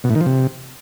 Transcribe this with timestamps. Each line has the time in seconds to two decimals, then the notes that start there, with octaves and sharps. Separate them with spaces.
0.04 B2
0.10 A2
0.15 D#3
0.21 F3
0.26 C3